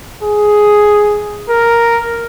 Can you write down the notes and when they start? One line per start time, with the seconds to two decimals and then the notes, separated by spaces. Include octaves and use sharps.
0.23 G#4
1.49 A#4